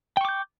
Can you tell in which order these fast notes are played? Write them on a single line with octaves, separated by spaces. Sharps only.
G5 C#6 D6 G6